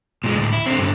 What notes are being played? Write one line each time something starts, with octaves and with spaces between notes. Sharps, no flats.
A#2 G#3
D2 A2
E4
D3 C4
G2 D3